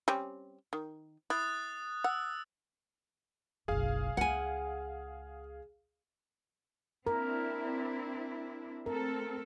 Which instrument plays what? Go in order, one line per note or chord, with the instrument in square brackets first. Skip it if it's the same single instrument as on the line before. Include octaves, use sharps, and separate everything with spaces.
[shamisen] G3 C4 C#4
D#3
[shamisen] E4 [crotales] D#6 F#6 A6
[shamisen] F#5 [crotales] E6
[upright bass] F#1 B1 [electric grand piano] G#4 F5
[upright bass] C#2 [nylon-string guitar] F#5 G#5
[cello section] C4 D4 E4 [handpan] A#4
[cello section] A3 C4 A4 [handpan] A#4